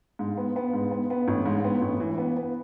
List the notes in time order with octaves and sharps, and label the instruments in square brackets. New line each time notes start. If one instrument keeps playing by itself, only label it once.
[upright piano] G#2
B3
B3
G#2
B3
B3
A1
G#2
B3
A1
E3
B3
B3